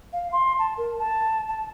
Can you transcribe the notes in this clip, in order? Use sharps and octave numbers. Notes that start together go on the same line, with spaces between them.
F5
C6
A5
A#4
A5
A5